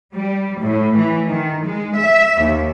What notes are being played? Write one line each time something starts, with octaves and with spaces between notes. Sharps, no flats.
G3
A2
E3
D#3
G#3
E5
D#2